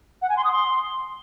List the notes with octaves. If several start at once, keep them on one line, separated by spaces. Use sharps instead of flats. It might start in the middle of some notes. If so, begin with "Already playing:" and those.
F#5
G#5
C6
D#6
C6